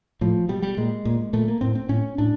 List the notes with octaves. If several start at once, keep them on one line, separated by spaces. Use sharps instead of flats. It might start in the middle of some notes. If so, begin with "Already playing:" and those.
A2 F3
B2 G3
G3
A#2 G#3
A#2
A#2 A3
A#3
A2 C4
C4
A2 C#4
A2 D4